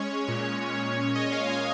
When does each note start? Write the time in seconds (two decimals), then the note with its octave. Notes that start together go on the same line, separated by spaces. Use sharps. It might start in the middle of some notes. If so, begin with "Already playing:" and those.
Already playing: G#3 C#4 C#5
0.11 C#4
0.28 A#2
0.46 A#2
0.63 A#2
0.80 G#3
0.98 A#2
1.14 C#4 D#5
1.32 G#3 F5
1.50 A#2 G#5